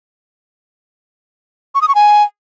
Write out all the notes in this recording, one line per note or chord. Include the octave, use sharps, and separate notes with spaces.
C#6
D#6
C#6
G#5